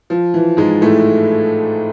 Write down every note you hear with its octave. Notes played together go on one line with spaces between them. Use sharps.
F3
E3
G#2 G#3
A2 A3